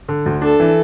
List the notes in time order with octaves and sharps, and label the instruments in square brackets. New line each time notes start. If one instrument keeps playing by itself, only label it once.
[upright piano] D3
D2
[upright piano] D4 [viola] A4
[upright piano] E3